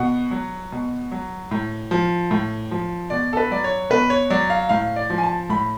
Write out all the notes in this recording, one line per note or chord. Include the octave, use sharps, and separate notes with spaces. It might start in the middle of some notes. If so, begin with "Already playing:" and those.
Already playing: B2 F#5
F#3
B2
F#3
A2
F3
A2
F3
B2 D5
A4
B4
F#3 D5
C#5
B2 B4
C#5
F#3 D5
F5
A2 F5
D5
F3
G#5
A5
A2 B5